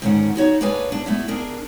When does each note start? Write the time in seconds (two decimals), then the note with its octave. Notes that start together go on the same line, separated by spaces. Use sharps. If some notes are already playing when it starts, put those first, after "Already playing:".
0.02 G#2 D3 D#3 C#4 A#4 F#5
0.36 D#4 F#4 C#5
0.61 A#3 D4 G#4 B4 C#5 G#5
0.92 D4
1.06 A3 B3 E4
1.28 D4 G#4 A#4